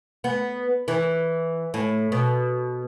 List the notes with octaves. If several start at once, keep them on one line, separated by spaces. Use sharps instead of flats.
B3
E3
A2
B2